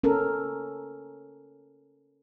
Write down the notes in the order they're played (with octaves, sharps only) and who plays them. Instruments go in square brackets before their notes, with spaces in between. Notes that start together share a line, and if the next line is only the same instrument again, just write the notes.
[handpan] C#4 A4 A#4